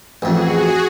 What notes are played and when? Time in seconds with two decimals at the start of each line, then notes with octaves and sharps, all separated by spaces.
0.22 A1 F2 F#4 G#4